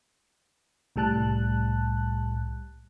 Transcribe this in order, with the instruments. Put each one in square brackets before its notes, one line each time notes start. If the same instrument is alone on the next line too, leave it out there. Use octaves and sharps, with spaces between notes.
[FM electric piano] C2 A2 G3 A5 F#6